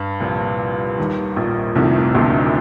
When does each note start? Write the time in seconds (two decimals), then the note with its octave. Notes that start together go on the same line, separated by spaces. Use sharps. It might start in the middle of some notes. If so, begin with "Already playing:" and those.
Already playing: G2
0.20 C2 A#2 F3
0.98 D#2 D#3 G3
1.36 A#1 A#2
1.75 C2 F2 C3 D#3 A3 D#4
2.15 D2 D3